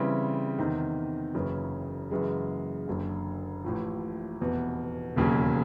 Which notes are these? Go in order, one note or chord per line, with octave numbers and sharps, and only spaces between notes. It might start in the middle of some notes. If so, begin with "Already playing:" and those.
Already playing: C#3 E3 G3 C4 E4
E2 C3 D#3
F#1 F#2 C#3 E3
F#2 C#3 E3 G#3
F#1 F#2 D3
A1 A2 F3
F1 E2 B2
E1 D#2 C#3 F#3